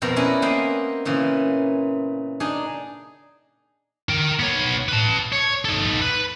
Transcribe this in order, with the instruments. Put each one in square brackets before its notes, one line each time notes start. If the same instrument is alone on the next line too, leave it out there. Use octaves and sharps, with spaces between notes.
[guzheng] F2 B2 C4 A#4 C5
C#4 E4 B4 D5 D#5
A#3 C4 C5 D#5 F5 F#5
A#2 C#3 E3
D4 D#4 G#4
[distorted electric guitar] A#4 G5
B3 C#5
B4 A5
C#5
D#4 A4
B4